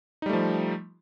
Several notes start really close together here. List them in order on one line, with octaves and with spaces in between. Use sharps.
D#4 G3 A3 F3